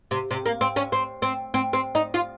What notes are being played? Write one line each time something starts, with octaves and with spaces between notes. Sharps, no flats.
C3
C3
A#3
C4
C#4
C4
C4
C4
C4
D#4
F4